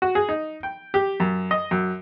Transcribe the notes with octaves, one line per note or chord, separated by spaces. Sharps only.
F#4
G#4
D#4
G5
G4
F#2
D#5
F#2